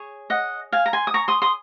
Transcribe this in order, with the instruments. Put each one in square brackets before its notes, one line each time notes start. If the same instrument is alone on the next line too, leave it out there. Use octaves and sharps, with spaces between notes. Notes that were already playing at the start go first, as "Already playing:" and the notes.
Already playing: [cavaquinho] G#4 C#5
D#5 F#5
F5 G#5
A#5
G#5 C6
D#6
A#5 C#6
C6 D#6
C6 D#6